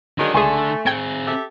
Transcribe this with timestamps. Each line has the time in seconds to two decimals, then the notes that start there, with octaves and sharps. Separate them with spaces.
0.18 D3 D#3 F#3 G#3 D4
0.34 C#2 A3 G#4 G#5 C6 C#6
0.86 C4 G#4 G5 G#6 C#7
1.26 G4 A4 E5